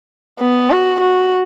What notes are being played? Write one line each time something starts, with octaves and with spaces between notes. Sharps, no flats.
B3
F#4
F#4